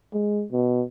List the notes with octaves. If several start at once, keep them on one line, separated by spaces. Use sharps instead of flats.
G#3
B2